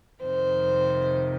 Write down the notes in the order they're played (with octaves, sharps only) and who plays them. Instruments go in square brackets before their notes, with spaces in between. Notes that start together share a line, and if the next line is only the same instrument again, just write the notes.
[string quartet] F2 C3 D#3 C5